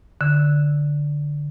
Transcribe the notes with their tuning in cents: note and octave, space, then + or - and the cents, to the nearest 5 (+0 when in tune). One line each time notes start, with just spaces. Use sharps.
D3 +0 E6 +0